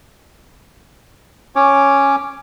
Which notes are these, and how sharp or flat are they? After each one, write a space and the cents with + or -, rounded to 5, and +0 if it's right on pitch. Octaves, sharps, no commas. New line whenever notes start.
C#4 +0 C#5 +0 D6 +0